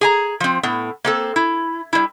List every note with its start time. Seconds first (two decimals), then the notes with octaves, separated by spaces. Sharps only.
0.01 G#4 G#5 A#5
0.40 F3 C4
0.63 A2 B3
1.04 A#3 C4 A4
1.36 E4
1.93 G3 E4